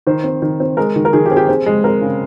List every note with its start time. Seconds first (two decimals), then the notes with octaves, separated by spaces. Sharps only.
0.07 D#3 C5
0.24 C4
0.42 D#3
0.60 C4
0.77 G#3 A#4
0.96 D#3
1.05 A#4
1.13 D#3 G#4
1.26 G4
1.31 C4 G#4
1.37 G4
1.48 C4 G#4
1.66 G#3
1.84 C4 A#4
2.01 C#3